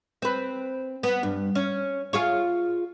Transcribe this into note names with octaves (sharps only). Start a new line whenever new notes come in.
C4 B4
B3
G2
C#4
F4 G#4 C#5